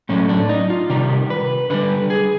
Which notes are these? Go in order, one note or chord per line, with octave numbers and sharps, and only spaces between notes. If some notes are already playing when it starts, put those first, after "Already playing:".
A2 F#3 A3 C#4
D4
D#4
F4
C3 D#3 G3 A#4
B4
D3 G3 B4
G#4